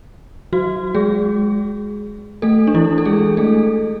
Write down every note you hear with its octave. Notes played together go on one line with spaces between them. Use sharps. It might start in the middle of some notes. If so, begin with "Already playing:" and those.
F#3 F#4
G#3 G#4
A3 A4
D4
E3 E4
A4
G#3 G#4
A3 A4